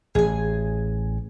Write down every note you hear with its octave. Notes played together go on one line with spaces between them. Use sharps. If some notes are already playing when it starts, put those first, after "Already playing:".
A1 G#4 G#5